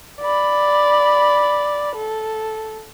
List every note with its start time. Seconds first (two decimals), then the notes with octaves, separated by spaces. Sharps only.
0.21 D5 B5
1.96 A4